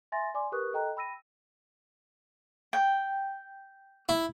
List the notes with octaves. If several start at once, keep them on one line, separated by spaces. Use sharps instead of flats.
E5 G#5 C6 A6 A#6
D5 G#5 C6 D6
G4 A#4 B4 C#6 D#6 F#6
A4 D#5 G5 A#5 F#6
G5 B5 E6 A#6 D#7
G5
E4